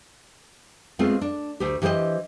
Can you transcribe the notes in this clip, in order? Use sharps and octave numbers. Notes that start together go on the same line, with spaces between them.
G#3 A3 B3 C4 F4
D4
D2 G4
E3 F#4 G4 C5 D#5